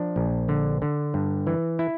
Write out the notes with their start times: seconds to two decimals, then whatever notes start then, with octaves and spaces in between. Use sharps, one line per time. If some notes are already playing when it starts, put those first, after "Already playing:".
Already playing: F3 D4
0.16 A#1
0.49 D3
0.82 D3
1.14 G2
1.47 E3
1.79 E4